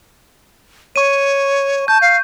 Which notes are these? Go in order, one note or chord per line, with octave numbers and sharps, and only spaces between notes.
C#5 C#6 D#7
A5 G6
F5